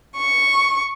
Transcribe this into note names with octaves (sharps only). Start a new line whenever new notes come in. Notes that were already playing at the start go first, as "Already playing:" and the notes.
C#6